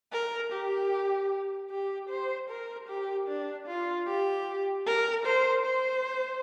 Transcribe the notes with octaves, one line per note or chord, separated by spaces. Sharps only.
A#4
G4
G4
C5
A#4
G4
D4
F4
G4
A#4
C5
C5